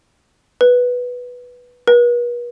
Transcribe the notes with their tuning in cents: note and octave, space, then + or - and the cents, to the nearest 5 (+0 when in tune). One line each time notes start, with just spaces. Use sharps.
B4 -5
B4 -45